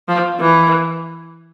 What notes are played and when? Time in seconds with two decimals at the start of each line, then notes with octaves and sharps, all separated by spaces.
0.08 F3
0.41 E3